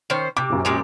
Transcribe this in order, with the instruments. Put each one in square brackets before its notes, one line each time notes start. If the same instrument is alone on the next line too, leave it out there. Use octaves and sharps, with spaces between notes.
[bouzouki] D#3 C#4 C5
[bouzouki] C3 [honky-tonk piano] D6
[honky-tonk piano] A#1 F#2
[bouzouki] A#2 G#3 G4